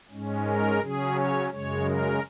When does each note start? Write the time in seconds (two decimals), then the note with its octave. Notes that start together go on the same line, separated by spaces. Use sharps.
0.10 G#2 G#3 C#4
0.45 A#4
0.80 C#3 F#3 C#4 G#4
1.15 C#5
1.50 F#2 C#3 G#3 C#5
1.85 A#4